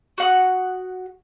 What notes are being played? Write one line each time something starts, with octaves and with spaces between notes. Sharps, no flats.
F#4 F#5 D#6